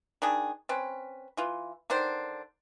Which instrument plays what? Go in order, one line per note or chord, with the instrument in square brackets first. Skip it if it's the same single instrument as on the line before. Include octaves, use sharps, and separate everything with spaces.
[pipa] D#3 D4 G#4
C4 C#4 B4
E3 F4
D3 D#3 D4 C5